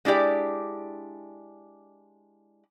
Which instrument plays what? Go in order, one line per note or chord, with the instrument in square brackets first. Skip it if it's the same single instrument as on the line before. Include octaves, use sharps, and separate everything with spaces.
[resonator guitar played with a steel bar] G#3 D4 E4 G4 D5